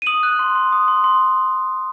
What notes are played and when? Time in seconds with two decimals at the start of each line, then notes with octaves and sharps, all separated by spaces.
0.02 D#7
0.06 D#6 F#7
0.23 F#6
0.39 C6
0.55 C6
0.72 D#6
0.88 C6
1.04 C6